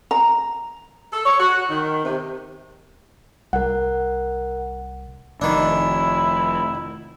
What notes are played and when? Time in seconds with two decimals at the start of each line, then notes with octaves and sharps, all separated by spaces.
0.11 A#5
1.11 A4
1.24 C#5
1.38 F#4
1.68 D#3
2.03 C3
3.53 C2 A#4 F#5
5.41 F1 D#3 D4 E4